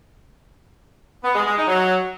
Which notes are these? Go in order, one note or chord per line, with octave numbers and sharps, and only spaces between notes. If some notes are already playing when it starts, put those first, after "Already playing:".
B3
G#3
G#3
D#4
F#3